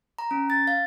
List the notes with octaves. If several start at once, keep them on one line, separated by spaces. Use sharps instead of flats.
A#5
C#4
A6
F5